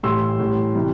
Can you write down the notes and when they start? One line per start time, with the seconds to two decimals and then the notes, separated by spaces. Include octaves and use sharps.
0.03 A2 E3 G3 C6 E6
0.39 A2 E3 G3
0.75 C3 E3 G3